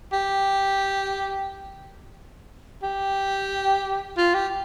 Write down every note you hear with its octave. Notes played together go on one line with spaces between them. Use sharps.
G4
G4
F4
G4